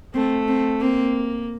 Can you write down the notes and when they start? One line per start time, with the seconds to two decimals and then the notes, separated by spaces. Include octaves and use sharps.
0.14 A3 C4
0.48 C4
0.81 A#3 C4